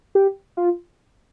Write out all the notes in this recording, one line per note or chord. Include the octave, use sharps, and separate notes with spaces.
G4
F4